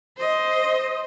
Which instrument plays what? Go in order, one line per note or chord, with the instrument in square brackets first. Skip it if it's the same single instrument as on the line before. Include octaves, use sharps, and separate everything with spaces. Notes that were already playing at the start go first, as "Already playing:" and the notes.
[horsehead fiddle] C5 D#5